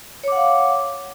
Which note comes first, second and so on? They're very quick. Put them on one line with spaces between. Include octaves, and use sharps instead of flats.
C#5 D6 F#5 F5